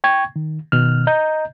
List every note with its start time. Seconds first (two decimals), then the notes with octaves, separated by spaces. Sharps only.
0.04 G5 C#6 G#6
0.36 D#3
0.72 B2 D#3 F6
1.07 D#5 A#5 G6